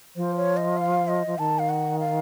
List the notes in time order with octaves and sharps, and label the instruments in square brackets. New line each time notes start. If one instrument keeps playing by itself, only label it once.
[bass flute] F3 [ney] C5
[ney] C#5
D#5
F5
D#5
[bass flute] F3
[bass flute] D#3 [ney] A5
[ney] F5
F#5
F5